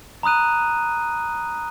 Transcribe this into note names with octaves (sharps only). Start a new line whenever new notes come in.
A#5 B5 D#6 F#6 D#7